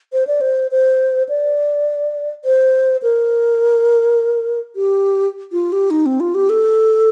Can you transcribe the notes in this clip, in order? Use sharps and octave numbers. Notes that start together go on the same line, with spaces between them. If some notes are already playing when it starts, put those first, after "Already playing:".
C5
D5
C5
C5
D5
C5
A#4
G4
F4
G4
D#4
C4
F4
G4
A4